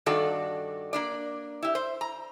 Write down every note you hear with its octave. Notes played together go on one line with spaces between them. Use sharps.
G2 D#3 D4 F#4 A4 D5
A#3 D4 D5
E4 G4
C5
A#5